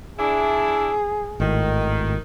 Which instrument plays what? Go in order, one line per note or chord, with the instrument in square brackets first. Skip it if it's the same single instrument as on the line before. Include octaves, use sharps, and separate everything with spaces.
[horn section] D4 E4 [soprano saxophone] G#4
[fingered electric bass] G#1 A2 [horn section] D#3